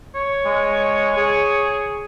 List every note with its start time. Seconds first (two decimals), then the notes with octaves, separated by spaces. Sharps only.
0.15 C#5
0.45 G#3
1.16 G#4